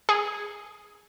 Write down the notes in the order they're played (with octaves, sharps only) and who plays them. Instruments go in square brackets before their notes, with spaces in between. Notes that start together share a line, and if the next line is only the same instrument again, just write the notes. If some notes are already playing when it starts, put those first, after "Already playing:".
[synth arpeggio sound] G#4